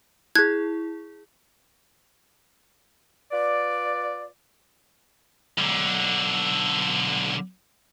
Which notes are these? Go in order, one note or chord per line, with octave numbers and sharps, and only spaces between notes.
E4 G#4 F#6 G#6
F4 B4 D5
B1 D3